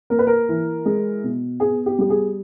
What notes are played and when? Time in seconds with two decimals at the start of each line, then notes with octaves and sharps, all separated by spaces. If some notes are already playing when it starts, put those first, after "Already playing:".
0.10 A#3 A#4
0.19 B4
0.27 A#4
0.49 E3
0.86 G#3
1.24 B2
1.60 B3 G#4
1.86 G4
1.99 G3 G4
2.10 G#4